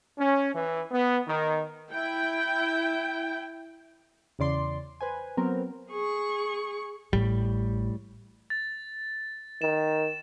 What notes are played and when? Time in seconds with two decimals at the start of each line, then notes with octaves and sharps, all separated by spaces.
0.18 C#4
0.54 E3
0.91 B3
1.28 D#3
1.92 E4 G5
4.39 E2 C#3 D5 C6
5.01 B4 C5 G#5
5.37 F#3 B3 C4 A#4
5.91 G#4 C#6
7.13 A1 A2 G3
8.50 A6
9.62 D#3 E7